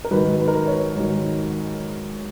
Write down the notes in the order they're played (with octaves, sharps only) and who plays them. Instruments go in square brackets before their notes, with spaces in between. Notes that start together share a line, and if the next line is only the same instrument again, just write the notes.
[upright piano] A#4
G#2 D#3 F#3 B4
B4
A#4
B4
C#5
G#2 D#3 F#3